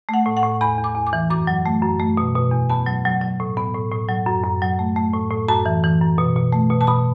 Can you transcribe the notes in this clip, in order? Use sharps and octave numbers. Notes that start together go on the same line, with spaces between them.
A3 F#5
A2
F#5
A2
E2 B5
E2
D6
E2
D6
E3
F#2 D6
F#3
A3
F#2
A3
B2
B2
E2
B3 A5
F#3
F#3
F#3
A2
B3
A2
A2
F#3
F#2
F#2
F#3
A3
A3
A2
A2
F#2 A5
E3
E3
F#2
B2
B2
A3
B2
A5
B2 B5